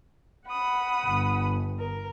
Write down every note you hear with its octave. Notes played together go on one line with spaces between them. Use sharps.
F#5 B5 D#6
G1
A#4